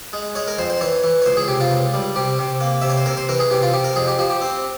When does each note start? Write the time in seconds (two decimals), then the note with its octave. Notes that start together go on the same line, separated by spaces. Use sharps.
0.13 G#3
0.35 G#3 C#5
0.48 A#4
0.58 F2 C5
0.70 C5
0.81 E3 C#5
1.04 E3
1.22 C#5
1.26 C#2 C5
1.37 G#4
1.48 C3 G4
1.60 F4
1.71 C#2
1.94 G3
2.16 C3 G4
2.39 C3
2.61 A#3
2.82 C3 E5
2.90 C#5
2.97 C5
3.06 C3 A#4
3.17 C5
3.29 E3 A#4
3.40 G#4
3.51 C3 G4
3.63 F4
3.73 C3 G4
3.84 A#4
3.96 F2 G#4
4.08 G4
4.19 F3 G4
4.30 G4
4.41 C4